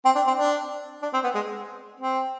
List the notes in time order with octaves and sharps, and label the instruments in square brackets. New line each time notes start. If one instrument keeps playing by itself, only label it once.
[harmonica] C4
D4
C4
D4
D4
C4
B3
G#3
C4